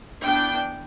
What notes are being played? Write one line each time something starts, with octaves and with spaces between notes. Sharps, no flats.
E3 B3 D4 G5